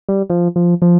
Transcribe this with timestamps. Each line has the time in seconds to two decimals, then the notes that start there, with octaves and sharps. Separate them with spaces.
0.09 G3
0.30 F3
0.56 F3
0.82 F3